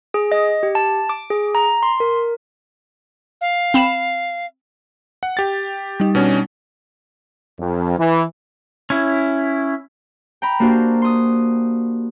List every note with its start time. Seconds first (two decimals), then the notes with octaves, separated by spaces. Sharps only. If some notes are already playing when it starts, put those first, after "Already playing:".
0.14 G#4
0.32 D#5
0.63 G4
0.75 A5
1.09 D6
1.30 G#4
1.55 A#5
1.83 C6
2.00 A#4
3.41 F5
3.74 C4 B5 E7
5.23 F#5
5.37 G4 A6
6.00 G3 D#4
6.15 B2 C#4 D4
7.59 F2
7.98 E3
8.90 C#4 E4
10.42 G5 A#5 B5
10.60 A#3 D4 F#4 G4 C5
11.02 C6 D#6